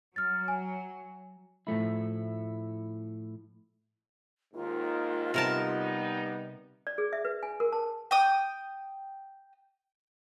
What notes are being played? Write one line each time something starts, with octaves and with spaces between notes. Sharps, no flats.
F#3 F6 A6
G#5
A2 F3 A3 E4
D#2 G#2 D#3 F4
C3 G3 B3 D#4 A#4 A5
D5
G#4
E5
B4
G#5
A#4
A5
G5 D#6